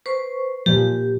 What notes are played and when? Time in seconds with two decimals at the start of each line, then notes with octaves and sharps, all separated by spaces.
0.06 B4 C5 C#6
0.66 A#2 F3 G4